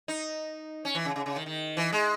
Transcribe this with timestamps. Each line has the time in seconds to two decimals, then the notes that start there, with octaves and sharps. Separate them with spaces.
0.08 D#4
0.85 C#4
0.95 E3
1.05 C#3
1.16 C#3
1.26 C#3
1.36 D#3
1.46 D#3
1.77 E3
1.92 G#3